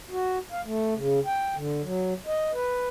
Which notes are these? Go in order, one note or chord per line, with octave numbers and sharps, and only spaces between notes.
F#4
F5
A3
C#3
G5
D3
F#3
D#5
B4